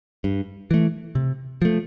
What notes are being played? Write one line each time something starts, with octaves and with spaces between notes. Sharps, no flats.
G2
E3 A3
C3
F3 A3